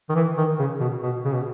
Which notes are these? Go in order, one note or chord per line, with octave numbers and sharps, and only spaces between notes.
D#3
E3
D#3
C#3
B2
B2
C#3
B2